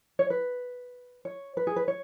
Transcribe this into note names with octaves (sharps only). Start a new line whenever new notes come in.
C#5
B4
C#5
B4
G#4
B4
C#5